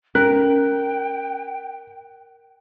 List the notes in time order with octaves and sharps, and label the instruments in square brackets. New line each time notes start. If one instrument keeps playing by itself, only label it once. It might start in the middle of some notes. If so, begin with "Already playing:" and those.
[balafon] C#4 [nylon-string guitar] A#4 [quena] G5 [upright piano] F#6